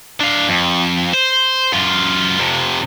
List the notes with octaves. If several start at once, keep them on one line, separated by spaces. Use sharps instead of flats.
D4 F5
F2
C5
F#2 F4
F2 C3